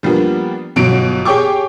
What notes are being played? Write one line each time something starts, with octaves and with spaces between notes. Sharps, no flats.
F3 G3 A#3 B3 D4
G1 B2 F#3 D7
G4 G#4 C#5 G5 C#6 D6